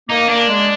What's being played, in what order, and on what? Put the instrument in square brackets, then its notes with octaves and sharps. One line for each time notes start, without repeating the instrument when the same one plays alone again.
[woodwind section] A#3 [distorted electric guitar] D#4
[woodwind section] A#3 [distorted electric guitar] D4
[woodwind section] G#3